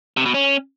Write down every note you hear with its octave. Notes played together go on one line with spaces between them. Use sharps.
C3
B2
C#4